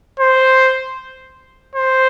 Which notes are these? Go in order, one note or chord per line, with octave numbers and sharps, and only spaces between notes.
C5
C5